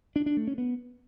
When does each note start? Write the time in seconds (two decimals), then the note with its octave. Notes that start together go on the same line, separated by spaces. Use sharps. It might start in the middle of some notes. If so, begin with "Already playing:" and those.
0.16 D4
0.26 D4
0.37 A3
0.47 C#4
0.58 B3